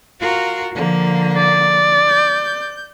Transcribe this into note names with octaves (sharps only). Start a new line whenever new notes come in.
F4 F#4 A#4
D3 F3 A#3
D5
G6